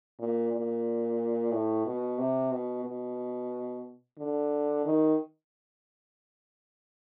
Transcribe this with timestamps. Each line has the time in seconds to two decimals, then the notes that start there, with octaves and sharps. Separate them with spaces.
0.19 A#2
0.52 A#2
1.52 A2
1.86 B2
2.19 C3
2.52 B2
2.85 B2
4.19 D3
4.85 D#3